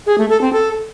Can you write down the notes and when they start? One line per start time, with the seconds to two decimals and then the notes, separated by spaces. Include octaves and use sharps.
0.06 G#4
0.18 A3
0.30 A4
0.41 C4
0.53 A4